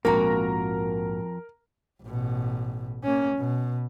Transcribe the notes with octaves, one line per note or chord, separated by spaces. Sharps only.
A#1 F2 G#2 A#3 F#4 A#4 A#5
A1 B2
A#3 C#4
B2